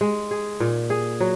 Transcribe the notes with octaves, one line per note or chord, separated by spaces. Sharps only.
G#3
G#4
A#2
G#4
F#3